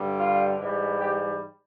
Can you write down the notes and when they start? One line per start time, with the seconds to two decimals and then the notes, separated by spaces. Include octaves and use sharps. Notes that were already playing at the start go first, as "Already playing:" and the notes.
Already playing: G2 D3 G3
0.18 F4
0.59 G#2 E3 G3
1.00 G4